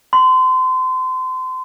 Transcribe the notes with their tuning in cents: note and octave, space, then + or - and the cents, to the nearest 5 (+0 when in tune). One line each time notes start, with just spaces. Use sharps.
C6 -30